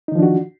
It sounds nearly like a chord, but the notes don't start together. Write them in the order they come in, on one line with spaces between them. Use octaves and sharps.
D#4 D#3 F3 D4 F#4